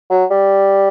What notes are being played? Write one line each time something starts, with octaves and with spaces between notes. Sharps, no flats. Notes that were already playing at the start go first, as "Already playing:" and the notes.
F#3
G3